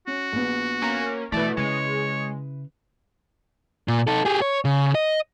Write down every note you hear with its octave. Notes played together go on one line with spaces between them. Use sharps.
C#4 F#4
A#1 B3
A#3 C#4
B2 E3 A3 E4 B4 D5
C#3 G#3 C#5
A#2
D#4 A4
G4 G#4
C#5
C#3
D#5